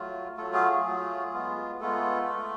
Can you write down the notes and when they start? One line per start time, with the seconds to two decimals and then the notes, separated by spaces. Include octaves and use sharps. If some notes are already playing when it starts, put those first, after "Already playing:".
Already playing: F#3 A3 F4
0.37 F#3 A3 F4 A4
0.53 G#4
0.69 G#4
0.85 F#3 A3 F4
1.33 G#3 B3 F4
1.81 G#3 A3 B3 F4 A4